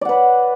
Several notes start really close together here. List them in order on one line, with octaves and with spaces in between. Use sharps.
D5 F#5 B4